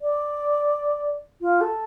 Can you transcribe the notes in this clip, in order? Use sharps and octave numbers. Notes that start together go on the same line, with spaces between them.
D5
F4
A4